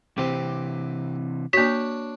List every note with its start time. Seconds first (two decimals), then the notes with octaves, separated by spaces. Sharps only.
0.18 C3 E3 C4 G4
1.53 A#3 D4 F#4 C#5 B6